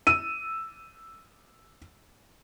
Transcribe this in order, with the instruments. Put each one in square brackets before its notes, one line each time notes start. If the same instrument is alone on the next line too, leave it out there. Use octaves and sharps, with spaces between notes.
[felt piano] E6 D#7